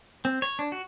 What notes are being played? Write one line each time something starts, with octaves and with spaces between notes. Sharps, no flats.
C4
C#5
D4
F#4